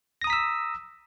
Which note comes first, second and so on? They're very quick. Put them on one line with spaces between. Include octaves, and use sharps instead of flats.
A#6 D#6 A#5 B6 E6